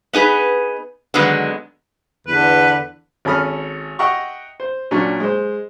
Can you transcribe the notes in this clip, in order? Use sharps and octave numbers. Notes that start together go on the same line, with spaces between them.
B3 D#4 G#4 B4
D3 D#3 F#3 G#3 B3
E2 D3 B4
G#1 C#4 A4 B5 D#6 F6
D#5 E5 F#5 G5 A#5 C#6
C5
A#2 F#3 C#4 D4
G#3 C5